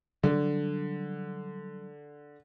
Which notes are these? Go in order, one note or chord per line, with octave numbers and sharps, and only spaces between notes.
D3 F#3 G3 D4